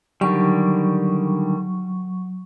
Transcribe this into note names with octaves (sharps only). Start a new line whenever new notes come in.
D3 D#3 F#3 G3 C#6